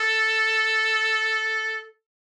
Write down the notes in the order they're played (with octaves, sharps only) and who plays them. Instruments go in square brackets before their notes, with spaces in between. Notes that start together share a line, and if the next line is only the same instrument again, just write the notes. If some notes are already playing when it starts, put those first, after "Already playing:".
Already playing: [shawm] A4